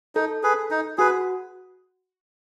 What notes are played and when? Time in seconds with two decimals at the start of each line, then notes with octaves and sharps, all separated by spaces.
0.15 D#4 A4
0.43 G#4 B4
0.71 D#4
0.98 F#4 G#4 B4